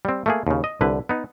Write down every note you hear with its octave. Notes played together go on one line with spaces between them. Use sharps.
G3 C4
A3 A#3 G#4
D#2 C#3
D#5
C2 D3 B4
B3 D#4